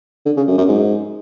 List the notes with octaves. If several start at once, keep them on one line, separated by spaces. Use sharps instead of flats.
D3
C#3
F#2
F#2
G#2